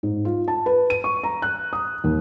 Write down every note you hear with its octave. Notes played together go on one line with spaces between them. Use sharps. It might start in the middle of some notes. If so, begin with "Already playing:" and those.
G#2
F4
A5
B4
D#7
C#6
A#5
F#6
D#6
D#2